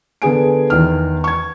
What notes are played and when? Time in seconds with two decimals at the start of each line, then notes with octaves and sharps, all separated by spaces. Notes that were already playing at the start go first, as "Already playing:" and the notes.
0.22 D3 B3 G#4 G#5 D7
0.70 E2 D#3 F6
1.24 C#6 G#6